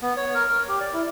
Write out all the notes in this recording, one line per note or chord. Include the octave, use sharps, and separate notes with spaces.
B3
C#5
A#4
A#4
G4
D5
E4